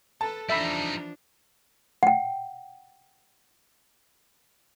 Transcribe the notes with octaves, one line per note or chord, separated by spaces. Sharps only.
A4 B4 A5
E3 F3 G3 D4 D#4 E5 B5
F#5 G5